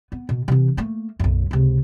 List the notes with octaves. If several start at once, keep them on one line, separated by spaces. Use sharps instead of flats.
B3
B2
C3 E3
A3 A#3
B1 F#2
C#2 C3